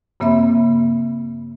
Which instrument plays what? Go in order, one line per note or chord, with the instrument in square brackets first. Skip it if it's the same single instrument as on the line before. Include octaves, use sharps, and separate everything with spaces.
[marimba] G2 C#3 A#3 C4 E5 B5